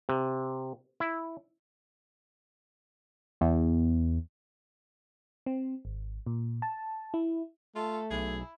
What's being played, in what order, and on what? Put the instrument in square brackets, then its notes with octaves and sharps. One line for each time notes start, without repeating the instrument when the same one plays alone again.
[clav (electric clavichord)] C3
E4
[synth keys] E2
[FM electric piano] C4
G#1
A#2
A5
E4
[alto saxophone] A3 [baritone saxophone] F4 [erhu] A4
[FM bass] B1 [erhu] E4 [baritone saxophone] G#4